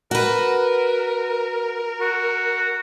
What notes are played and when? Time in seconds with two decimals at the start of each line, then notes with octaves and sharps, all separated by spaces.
0.11 F#4 A#4 B4
2.01 F#4